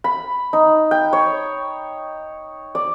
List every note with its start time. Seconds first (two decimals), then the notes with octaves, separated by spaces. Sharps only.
0.04 B5
0.53 D#4
0.91 G5
1.13 C#5
2.75 D5